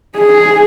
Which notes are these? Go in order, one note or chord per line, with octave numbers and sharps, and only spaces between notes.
G#4